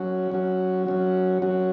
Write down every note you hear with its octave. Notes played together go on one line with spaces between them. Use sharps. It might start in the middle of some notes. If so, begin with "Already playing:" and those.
Already playing: F#3 C#4 F#4
F#3 C#4 F#4
F#3 C#4 F#4
F#3 C#4 F#4